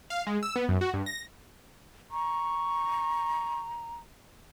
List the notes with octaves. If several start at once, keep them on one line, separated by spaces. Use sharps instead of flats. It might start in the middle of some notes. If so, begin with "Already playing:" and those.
F5
G#3
E6
B3
F#2
F#4
G2
A#6
A#5 C#6